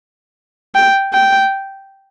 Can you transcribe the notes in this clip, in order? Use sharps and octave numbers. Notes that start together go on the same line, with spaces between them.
G5
G5